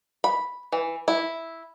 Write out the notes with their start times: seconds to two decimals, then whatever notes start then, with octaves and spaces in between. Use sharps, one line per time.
0.24 B5
0.72 E3
1.08 E4